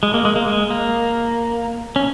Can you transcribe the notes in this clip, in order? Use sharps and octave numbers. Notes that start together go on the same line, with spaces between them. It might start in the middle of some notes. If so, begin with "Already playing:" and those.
G#3
A#3
G#3
A#3
G#3
A#3
C#4